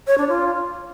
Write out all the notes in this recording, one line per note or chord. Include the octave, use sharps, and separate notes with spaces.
C#5
D4
F4